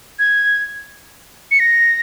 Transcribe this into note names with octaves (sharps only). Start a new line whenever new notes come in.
G#6
C#7
A#6